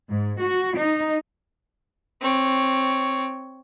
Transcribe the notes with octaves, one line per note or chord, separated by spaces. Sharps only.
G#2
F#4
D#4
C4 C#5